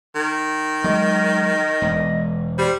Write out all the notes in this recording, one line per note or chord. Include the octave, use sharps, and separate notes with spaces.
D#3
F#3 G#3 D#5
E1
G3 C5